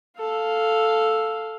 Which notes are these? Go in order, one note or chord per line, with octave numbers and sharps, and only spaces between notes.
A4 F5